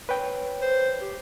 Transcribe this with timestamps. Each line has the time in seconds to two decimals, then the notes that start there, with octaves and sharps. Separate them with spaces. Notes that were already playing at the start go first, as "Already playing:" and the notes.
0.09 B4 C#5 G5
0.61 C5
1.01 G4